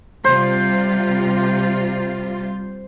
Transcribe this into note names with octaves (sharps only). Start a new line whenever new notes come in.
C3 G3 F4 C5